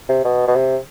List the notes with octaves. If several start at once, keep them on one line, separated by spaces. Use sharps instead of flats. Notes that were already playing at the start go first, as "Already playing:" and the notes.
C3
B2
B2
C3